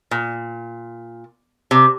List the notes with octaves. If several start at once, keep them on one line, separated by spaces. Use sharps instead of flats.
A#2
C3